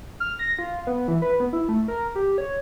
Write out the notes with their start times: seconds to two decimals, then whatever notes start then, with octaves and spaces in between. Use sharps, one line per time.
0.20 F6
0.39 A#6
0.59 F4
0.87 B3
1.08 E3
1.22 B4
1.40 B3
1.53 E4
1.69 A3
1.88 A#4
2.15 G4
2.38 C#5